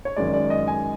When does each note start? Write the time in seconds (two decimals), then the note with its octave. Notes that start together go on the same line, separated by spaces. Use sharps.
0.05 C#5
0.16 F#2 D#3 G#3 D5
0.33 D5
0.50 D#5
0.68 G#5